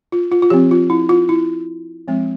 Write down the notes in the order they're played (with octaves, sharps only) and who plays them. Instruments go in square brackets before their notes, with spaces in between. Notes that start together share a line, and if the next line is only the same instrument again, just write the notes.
[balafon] F4
F4
F4
F3 C4 G4
F4
E4
F4
E4
F3 G#3 C4